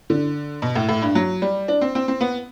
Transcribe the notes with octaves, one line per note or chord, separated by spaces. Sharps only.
D3
B2
A2
A2
G2
F#3
G3
D4
C4
C4
C4
B3